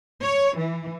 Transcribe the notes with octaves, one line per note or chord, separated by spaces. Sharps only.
C#5
E3